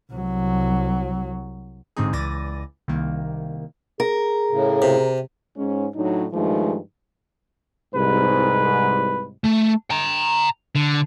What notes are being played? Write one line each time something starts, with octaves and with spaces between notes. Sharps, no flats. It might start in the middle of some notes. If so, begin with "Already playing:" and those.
C2 F#3
A1 G#2 D3 C4 D#4 G#4
C#2 E3 D5 A6 A#6 D#7
C2 D#3 A#3
G#4 A#4
A2 C#3
C3
G#2 C#4
A2 F#3 D4 D#4
G2 D#3 F3 G#3 A3 D#4
C2 G#2 B4
A3
G5 A#5
D3